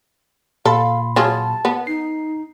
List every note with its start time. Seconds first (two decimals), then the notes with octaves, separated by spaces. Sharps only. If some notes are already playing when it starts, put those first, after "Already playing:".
0.65 A#2 A4 F5 B5 C6
1.16 F#3 F4 G#4 A5
1.65 B3
1.87 D#4 C7